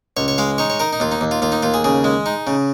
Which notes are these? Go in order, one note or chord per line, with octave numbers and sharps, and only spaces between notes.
C#2 C#5
C#5
G#3 F5
D#4 C#5
C#5
D#4 A#4
D#4
D#2 F4
D#4
D#2
F4
D#2 F4
D#4
D#2 F4
G#4
C#3 G#4
G#3
D#4
C#3